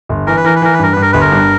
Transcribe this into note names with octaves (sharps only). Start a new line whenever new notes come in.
G1
E3 A#4
B4
E3 A#4
B4
E3 A#4
B4
G2 A#4
G2 B4
A#4
G1 B4
A#4
G2